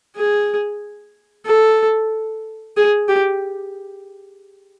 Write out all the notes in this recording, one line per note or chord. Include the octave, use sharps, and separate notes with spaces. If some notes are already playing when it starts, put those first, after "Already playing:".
G#4
A4
G#4
G4